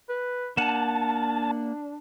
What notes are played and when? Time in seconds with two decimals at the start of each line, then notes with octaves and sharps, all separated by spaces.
0.09 B4
0.57 A#3 D4 F#5 A5